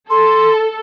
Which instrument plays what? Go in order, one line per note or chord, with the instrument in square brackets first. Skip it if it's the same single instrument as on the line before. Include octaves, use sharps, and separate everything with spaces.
[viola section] A4 [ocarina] C6